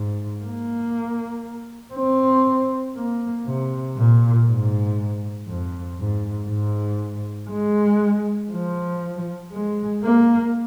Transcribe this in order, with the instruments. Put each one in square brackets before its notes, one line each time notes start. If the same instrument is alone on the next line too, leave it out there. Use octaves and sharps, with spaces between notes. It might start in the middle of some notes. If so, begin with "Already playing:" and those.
Already playing: [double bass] G#2
A#3
C4
A#3
C3
A#2
G#2
F2
G#2
G#2
G#3
F3
G#3
A#3